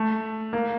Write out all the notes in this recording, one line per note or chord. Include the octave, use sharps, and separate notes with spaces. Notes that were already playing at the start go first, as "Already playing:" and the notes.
Already playing: A3
A#3